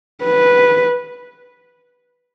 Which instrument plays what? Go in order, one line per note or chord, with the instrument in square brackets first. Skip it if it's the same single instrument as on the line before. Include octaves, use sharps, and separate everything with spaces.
[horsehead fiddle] B4